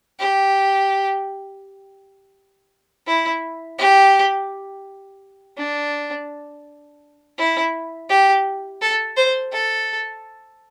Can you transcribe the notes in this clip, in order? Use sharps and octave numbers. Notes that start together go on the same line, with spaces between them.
G4
E4
G4
D4
E4
G4
A4
C5
A4